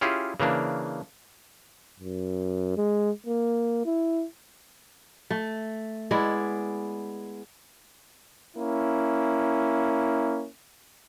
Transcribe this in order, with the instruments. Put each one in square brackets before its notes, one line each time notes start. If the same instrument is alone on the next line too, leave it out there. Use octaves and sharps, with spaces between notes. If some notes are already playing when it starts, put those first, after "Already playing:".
[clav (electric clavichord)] C#4 E4 F4 G4 G#4
C#3 E3 A#3 D4
[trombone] F#2
G#3
A#3
E4
[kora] A3
G#3 B3 E4 D5
[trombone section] A#3 C#4 E4